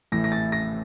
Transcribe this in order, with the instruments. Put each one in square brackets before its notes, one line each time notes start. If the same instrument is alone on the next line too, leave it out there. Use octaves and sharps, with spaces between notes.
[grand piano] A1 A2 E3 A#6
A#6
A6
A#6